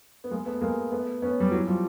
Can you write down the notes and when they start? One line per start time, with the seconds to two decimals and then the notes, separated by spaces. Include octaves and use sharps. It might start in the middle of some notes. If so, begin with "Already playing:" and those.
0.24 B3
0.31 G#3 A#3
0.46 A3 B3
0.61 G#3 A#3
0.91 A3 B3
1.22 B3 C#4
1.40 G3
1.52 E3 F#3
1.67 F3 G3